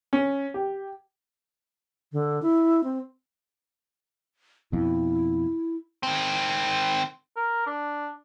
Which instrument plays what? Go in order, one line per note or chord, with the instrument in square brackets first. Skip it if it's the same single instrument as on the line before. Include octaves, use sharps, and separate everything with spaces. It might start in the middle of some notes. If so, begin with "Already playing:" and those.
[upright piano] C#4
G4
[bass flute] D3
E4
C4
[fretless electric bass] F2 B2 [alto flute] E4
[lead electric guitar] D#3 C4
[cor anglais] A#4
D4